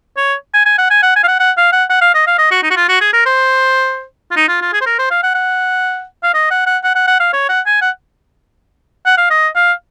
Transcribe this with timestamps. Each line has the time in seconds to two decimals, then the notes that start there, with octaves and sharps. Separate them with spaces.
0.17 C#5
0.54 G#5
0.66 G#5
0.78 F#5
0.90 G#5
1.02 F#5
1.16 G#5
1.23 F5
1.28 F#5
1.40 F#5
1.57 F5
1.72 F#5
1.90 F#5
2.01 F5
2.14 D#5
2.27 F5
2.38 D#5
2.51 F#4
2.63 D#4
2.70 F#4
2.76 F4
2.89 F#4
3.01 G#4
3.13 A#4
3.26 C5
4.31 F4
4.36 D#4
4.48 F4
4.61 F4
4.73 G#4
4.81 C5
4.86 A#4
4.99 C5
5.11 F5
5.23 F#5
5.35 F#5
6.23 F5
6.34 D#5
6.50 F#5
6.66 F#5
6.84 F#5
6.95 F#5
7.08 F#5
7.20 F5
7.33 C#5
7.49 F#5
7.66 G#5
7.81 F#5
9.06 F#5
9.17 F5
9.31 D#5
9.55 F5